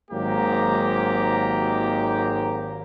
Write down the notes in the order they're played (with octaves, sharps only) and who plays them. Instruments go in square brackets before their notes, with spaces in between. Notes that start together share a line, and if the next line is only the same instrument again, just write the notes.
[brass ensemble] G#1 G#2 F#3 A#3 G4 A#5